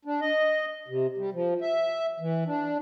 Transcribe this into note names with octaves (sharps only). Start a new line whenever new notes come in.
D4
D#5
C3
G3
F3
E5
E3
D4